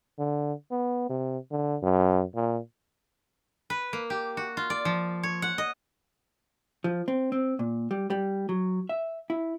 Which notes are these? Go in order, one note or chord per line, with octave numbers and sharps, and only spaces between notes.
D3
B3
C3
D3
F#2
A#2
B4
A#3
G4
F#4
F4
D5
F3
C#5
F#5
D#5
F3
C4
C4
A#2
G3
G3
F#3
E5
E4